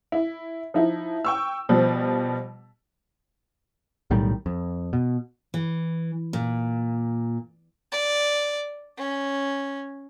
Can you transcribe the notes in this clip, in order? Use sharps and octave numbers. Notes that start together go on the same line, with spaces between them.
E4
F3 D#4 E4
G5 C#6 E6
B2 F3 G3 C4
B1 A2 D#3 G3
F2
B2
E3
A#2
D5
C#4